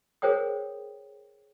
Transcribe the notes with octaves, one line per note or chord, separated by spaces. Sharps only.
G#4 A#4 C5 C#5 G5 D#6